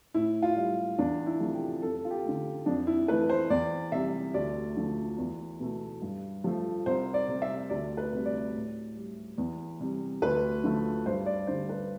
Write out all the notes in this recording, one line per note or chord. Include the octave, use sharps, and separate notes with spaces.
A2 E4
F4
G3
E2 D4
E4
C3 F3 A3
G4
F2 A4
F4
G4
D3 A3
F2 D4
E4
E3 A3 B4
C5
E2 D5
C3 G3 E5
D2 D5
D3 F3 A3
E2
B2 A3
G2
F3 A3
C2 C5
D5
C3 G3
E5
D2 D5
B4
C3 G3
D5
A2
G3
E2
C3 G3
D2 B4
D3 F3 A3
G2 C5
D5
D3 G3 C5
B4